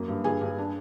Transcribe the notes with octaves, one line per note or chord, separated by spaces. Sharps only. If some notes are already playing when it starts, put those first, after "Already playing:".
Already playing: F#2 A#3
G2
G2 G#4 G#5
G2
D4